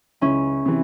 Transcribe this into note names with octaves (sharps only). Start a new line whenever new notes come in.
C#2 C#4 E4
C3 E3